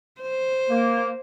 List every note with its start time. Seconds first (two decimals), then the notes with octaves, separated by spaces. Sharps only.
0.21 C5
0.69 A#3